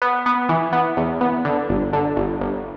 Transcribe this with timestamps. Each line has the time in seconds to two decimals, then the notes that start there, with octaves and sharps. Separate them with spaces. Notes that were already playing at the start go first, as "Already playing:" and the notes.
0.02 B3
0.26 B3
0.49 E3
0.73 B3
0.97 E2
1.21 B3
1.45 D3
1.69 G1
1.93 D3
2.17 G1
2.41 G1